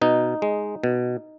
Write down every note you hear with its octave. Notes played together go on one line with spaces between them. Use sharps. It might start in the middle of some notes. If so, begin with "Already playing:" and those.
B2 D#4
G#3
B2